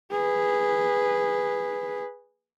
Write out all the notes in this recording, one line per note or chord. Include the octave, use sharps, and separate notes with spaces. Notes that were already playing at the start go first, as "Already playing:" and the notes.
G#4 B4